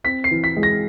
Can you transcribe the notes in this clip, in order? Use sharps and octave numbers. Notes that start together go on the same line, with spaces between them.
C4 B6
C7
E3
B6
G#3
A#6